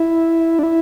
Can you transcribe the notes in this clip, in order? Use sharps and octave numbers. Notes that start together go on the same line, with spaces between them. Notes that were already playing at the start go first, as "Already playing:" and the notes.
Already playing: E4
D4
E4